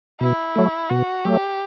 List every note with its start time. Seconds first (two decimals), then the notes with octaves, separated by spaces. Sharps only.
0.21 B2 E4
0.56 F#3 A3
0.90 B2 F#4
1.25 F#3 A3 G4